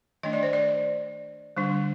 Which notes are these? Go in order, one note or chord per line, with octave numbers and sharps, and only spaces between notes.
D#3 A3 D4 D#5
D5
C5
D5
D3 G3 D4